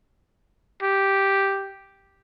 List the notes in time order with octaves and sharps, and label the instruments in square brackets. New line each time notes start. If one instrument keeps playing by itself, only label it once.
[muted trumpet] G4